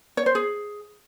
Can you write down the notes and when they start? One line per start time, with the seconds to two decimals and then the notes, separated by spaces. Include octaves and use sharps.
0.17 C#5
0.26 C5
0.35 G#4